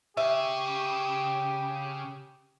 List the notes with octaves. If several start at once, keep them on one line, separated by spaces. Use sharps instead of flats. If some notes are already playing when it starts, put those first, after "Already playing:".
C#3 G4 E5